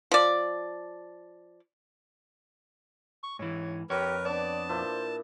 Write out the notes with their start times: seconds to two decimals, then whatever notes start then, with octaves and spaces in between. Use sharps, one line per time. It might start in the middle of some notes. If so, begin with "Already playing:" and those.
0.11 F3 D5
3.23 C#6
3.39 G#2 E3 C#5
3.90 F2 G4 A#4 B4 C#5
4.25 B3 D4 D5 A5
4.69 A#2 D4 E4 C5